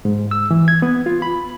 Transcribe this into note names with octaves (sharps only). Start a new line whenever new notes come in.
G#2
E6
E3
G#6
B3
F4
B5